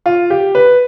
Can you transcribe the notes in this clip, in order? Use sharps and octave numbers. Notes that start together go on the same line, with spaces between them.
F4
G4
B4